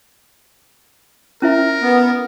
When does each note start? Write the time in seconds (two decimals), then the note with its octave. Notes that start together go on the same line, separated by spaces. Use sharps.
1.42 C#4 E4 A#4 E5
1.82 B3